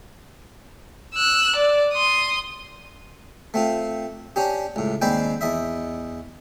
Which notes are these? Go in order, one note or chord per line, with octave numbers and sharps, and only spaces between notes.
E6 F#6
D5
C6 D#6
A3 C4 F4
C#4 D4 G4
C#2 A2
D#2 G#3 C4 B4 D5 G5
E2 D#5 E5